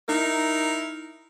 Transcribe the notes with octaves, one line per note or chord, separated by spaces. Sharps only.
D#4 E4 A#4